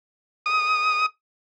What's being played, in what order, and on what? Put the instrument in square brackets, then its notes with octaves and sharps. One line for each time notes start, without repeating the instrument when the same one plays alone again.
[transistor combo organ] D#6